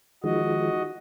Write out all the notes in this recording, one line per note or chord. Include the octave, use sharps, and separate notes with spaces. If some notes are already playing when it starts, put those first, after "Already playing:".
D#3 F3 G#3 F#4 D#5